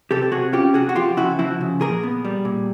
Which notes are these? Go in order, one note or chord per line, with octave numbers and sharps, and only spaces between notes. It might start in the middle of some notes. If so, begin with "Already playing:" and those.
C3 G4 A4
A4
C3 F#4 G#4
C#4 F4 G4
C3 F#4 G#4
F#4
F3 F4 G4
C#3 E4 F#4
F3 E4 F#4
C#3
A#2 G#4 A#4
B3
G3
A#2